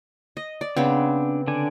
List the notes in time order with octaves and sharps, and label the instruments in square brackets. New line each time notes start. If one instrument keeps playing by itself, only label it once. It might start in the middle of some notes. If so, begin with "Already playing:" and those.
[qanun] D#5
D5
[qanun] C#3 B3 C4 [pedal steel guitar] D4
[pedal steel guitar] D3 D4 G#5